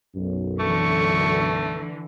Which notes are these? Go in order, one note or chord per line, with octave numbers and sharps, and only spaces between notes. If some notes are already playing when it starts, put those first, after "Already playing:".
B1 F#2
D3 E3 A3 C#6